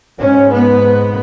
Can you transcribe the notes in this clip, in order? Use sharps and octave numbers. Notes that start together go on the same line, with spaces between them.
G#2 C#4
B3